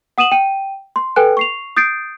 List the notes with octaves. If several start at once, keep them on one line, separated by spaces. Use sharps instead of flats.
F#5 D#6 D#7 E7 F#7
G5 D#7
C6
A4 B4 G5 G#5 F#6
C#6 C7 F7
D#6 G6 A6 C7 D7